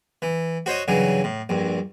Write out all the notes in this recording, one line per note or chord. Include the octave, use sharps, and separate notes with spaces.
E3
F#4 C5 C#5 D#5
G2 C#3 E3 F#3
A2
A#1 G2